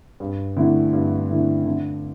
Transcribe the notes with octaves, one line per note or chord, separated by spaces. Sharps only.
G2
D3 A3 E4
G2
D3 A3 E4
D3